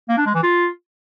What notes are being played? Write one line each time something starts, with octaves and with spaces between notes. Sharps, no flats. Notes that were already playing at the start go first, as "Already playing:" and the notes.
A#3
D4
G#3
E3
F4